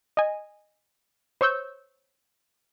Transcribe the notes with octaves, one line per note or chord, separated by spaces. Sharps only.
D#5 G#5
C5 C#5 C#6 E6 G6